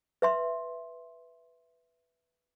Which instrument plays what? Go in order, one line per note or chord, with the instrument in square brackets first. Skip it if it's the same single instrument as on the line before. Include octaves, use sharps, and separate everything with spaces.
[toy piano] B4 E5 C6